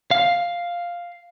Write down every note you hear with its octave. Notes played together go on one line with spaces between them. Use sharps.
F5